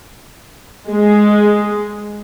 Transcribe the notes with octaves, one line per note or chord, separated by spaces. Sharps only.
G#3